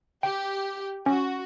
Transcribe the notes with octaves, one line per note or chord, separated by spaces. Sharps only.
G4 G5
C#4 F#4